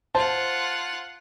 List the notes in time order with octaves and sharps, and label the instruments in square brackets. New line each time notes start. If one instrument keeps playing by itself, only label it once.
[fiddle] F4 F#5 [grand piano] C5 A5